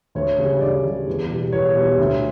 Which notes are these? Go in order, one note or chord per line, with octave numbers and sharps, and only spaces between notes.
D2 C#5
C#3 G3
D2 D5
C#3 G3
E2
B2 G3
E2 C#5
B2 G3
D2